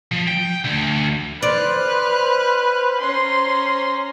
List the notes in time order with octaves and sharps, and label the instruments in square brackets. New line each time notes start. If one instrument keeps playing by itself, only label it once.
[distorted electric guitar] F3
G5
D2
[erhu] B4 [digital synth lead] C5 [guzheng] D5 [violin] F6 F#6
[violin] C#4 A#5 [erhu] C6